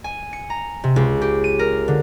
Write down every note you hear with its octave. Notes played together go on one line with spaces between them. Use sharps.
G#5
C#7
A#5
C3
C#2
G4
D#7
A#4
D3